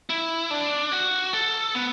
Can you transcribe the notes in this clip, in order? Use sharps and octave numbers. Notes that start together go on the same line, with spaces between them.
E4
D4
F#4
A4
B3